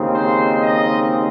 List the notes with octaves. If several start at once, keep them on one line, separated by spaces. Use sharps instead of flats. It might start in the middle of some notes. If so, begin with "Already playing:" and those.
Already playing: D#2 C#3 G#3 C4 D#4
C5
D#5